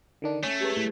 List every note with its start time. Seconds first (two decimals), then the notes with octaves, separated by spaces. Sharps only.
0.22 D3 D#3 D4
0.43 A3 C#4
0.61 G4 G#4 B4
0.77 A2 A6